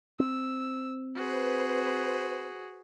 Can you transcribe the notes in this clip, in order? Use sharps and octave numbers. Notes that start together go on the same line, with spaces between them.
C4 E6
F#4 G#4 B4 C5